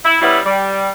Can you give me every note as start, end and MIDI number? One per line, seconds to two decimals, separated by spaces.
0.04 0.16 64
0.21 0.39 55
0.21 0.39 59
0.21 0.39 61
0.21 0.39 64
0.45 0.89 55